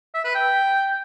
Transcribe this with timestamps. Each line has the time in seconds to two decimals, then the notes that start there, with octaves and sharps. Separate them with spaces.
0.14 E5
0.24 B4
0.34 G5